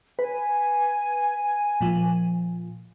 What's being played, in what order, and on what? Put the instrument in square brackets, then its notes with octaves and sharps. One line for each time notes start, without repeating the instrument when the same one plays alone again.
[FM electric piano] B4 [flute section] G#5
[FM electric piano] A#2 F3